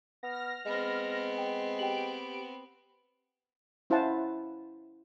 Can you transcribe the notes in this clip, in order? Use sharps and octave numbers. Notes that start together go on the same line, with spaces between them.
B3 F6 A#6
G#3 B3 C4
G5
G4 G5 D7 F#7
C#4 E4 C5 F5 F#5 A5